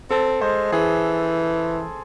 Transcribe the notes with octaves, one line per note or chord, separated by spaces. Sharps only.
C4 A4
G#3 C5
E3 G#4